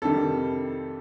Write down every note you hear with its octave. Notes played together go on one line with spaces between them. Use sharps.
F2 C3 D#3 G3 A4